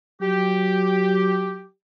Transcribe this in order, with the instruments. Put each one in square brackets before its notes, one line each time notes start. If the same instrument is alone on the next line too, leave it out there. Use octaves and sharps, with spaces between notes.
[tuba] F#3 [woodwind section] G4